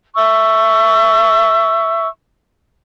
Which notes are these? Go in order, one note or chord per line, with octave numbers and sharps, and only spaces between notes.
E5 C#6 E6